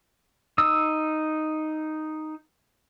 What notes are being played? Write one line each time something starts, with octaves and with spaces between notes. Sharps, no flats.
D#4 D#6 E6